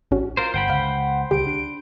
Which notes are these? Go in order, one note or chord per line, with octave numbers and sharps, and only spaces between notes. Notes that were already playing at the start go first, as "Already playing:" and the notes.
A1 C#4 F#4
F4 A#4 C5
G1 C5 F#5 G5 B5
C#2 F5 G6
C#2 D3 G3 G4 D7
D4